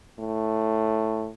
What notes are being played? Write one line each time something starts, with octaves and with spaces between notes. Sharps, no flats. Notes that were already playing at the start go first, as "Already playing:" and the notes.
A2